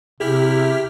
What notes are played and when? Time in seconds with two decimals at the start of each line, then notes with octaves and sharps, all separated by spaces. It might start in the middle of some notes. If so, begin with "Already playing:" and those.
0.20 C3 E4 G4 G#4 F6 B6